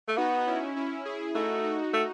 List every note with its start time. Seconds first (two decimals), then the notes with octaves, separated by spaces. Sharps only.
0.08 A3
0.17 B3 D#4 F#4
0.47 C#4 E4
0.76 C#4 E4
1.05 E4 G#4
1.34 A3 D#4 F#4
1.64 D#4 F#4
1.93 A3